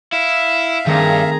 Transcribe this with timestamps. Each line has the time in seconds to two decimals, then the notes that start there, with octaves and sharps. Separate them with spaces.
0.13 E4 E5 F5
0.86 G2 D#3 A3 C4 G#4 A#5